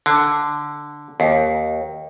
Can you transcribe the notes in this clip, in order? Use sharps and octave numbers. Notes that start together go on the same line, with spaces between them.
D3
D#2